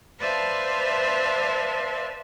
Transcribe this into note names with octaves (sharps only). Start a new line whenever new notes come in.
B4 C5 D5 E5 F5 A5